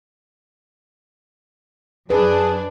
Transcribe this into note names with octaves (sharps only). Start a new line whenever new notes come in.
F#2 D4 G#4 B4